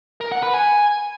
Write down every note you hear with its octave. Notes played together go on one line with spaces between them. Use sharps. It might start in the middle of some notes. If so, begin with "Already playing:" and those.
A#4
F#5
B4
G#5